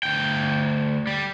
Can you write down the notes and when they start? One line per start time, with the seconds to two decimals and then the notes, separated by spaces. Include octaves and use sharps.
0.03 D2 G5
1.07 G3